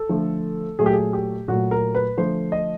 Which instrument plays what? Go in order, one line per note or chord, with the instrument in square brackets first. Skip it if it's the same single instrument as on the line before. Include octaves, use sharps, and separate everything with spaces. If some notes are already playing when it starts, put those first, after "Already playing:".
Already playing: [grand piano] A4
D3 F3 A3
A#2 F#3 A3 G#4
G4
G#4
G4
A#2 F#3 A3 F#4
A#4
B4
D3 F3 A3 C5
D#5